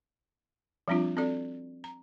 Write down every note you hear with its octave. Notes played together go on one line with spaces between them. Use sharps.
F3 G3 C4 D4 F4
C4 F#4 A4 D5
A#5